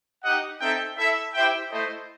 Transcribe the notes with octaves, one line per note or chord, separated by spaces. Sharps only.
D#4 G4 D#5 F#5
C4 D#4 A4 E5 G5
E4 A4 E5
E4 G4 C5 E5 G5
A3 E4 A4 C5 D#5